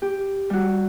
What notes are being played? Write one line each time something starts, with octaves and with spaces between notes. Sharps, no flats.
G4
G3 F#4